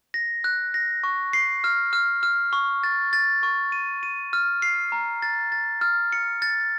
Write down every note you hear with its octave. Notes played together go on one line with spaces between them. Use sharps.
A#6
F#6
A#6
C#6
C7
F6
F6
F6
C#6
A6
A6
C#6
D#7
D#7
F6
C7
A#5
A6
A6
F6
C#7
A6